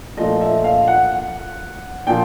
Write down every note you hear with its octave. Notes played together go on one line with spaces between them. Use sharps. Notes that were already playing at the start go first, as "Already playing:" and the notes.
A#2 F3 A3 D#5
E5
F5
F#5
A#2 F3 G5